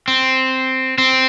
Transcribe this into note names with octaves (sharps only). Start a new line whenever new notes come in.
C4
C4